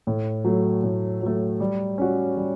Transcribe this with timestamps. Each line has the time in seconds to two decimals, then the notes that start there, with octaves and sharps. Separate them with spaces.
0.07 A2
0.44 F#3 A3
0.83 A2
1.22 F#3 A3
1.60 G3
1.98 C#4 F#4
2.37 G3